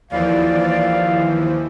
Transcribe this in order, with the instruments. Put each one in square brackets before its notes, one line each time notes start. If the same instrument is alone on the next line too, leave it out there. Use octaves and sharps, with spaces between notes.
[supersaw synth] D#2 E3 F3 [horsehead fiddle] D5 [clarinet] F5